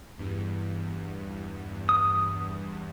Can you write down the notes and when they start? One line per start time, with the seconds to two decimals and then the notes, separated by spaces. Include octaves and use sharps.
0.18 E2 G2
1.89 D#6